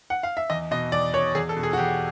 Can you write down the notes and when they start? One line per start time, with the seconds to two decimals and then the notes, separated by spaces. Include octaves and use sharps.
0.10 F#5
0.23 F5
0.37 E5
0.50 E2 D#5
0.71 B2 D#5
0.92 E2 D5
1.13 B2 C#5
1.35 E2 G#4
1.49 A4
1.57 B2
1.63 G#4
1.73 F#4
1.77 E2 G4